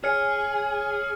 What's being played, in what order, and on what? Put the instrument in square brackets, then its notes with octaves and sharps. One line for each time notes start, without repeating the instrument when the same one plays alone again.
[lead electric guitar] G#4 [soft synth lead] C#5 [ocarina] G#5 [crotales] F6 C#7